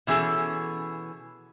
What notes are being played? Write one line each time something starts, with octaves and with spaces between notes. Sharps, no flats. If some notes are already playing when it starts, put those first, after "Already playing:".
B2 E3 C#4 G#4 A4